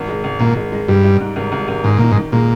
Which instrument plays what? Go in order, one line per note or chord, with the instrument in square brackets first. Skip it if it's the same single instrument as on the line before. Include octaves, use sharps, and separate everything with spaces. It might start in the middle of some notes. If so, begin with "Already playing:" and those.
Already playing: [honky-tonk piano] G#1
G#3
G#1
[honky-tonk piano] G#1 [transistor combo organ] A#2
[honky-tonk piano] G#3
G#3
[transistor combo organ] G2 [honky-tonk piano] G3
[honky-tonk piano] G3
G#2
G#1
G#1
G#1
[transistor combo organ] G#2 [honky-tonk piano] D#3
[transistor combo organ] A#2 [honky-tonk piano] D#3
[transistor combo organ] G#2
[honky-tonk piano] D#3
[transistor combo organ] A#2 [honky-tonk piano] G#3